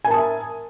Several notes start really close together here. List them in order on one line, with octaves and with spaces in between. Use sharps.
G#5 A#4 A5 D#6 E5